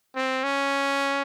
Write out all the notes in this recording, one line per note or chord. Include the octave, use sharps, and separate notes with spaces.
C4
C#4